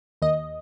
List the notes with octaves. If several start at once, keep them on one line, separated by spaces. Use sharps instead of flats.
D#2 D#5